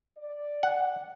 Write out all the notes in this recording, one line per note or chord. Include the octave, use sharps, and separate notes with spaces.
D5
F#5